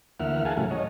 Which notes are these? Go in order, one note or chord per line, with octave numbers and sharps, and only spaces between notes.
D2 E3 A#3 E5 F#5 F6
G#4 A#4 F5 F#5 G#5 A5
A2 C#3 E3 F#3 G3 A3
C#5 D#5